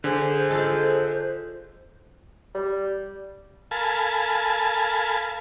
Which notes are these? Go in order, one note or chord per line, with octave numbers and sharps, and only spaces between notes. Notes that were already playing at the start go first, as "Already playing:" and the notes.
D3 G#4 C5
F4 A4 D#5
G3
A4 A#4 F5 G#5 A5 B5